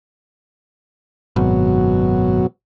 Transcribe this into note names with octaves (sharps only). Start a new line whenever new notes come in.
G#1 F#2 B2 F#3